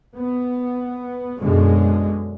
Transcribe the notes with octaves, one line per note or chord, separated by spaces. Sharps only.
B3
F#2 B2 D3 G#3